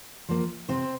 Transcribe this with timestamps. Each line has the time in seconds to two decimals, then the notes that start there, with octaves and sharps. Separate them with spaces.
0.29 F3 A#3
0.69 C3 C4 C5